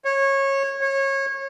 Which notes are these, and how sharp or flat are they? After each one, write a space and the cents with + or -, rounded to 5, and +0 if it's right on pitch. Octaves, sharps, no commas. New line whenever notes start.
C#5 -20
C#5 -25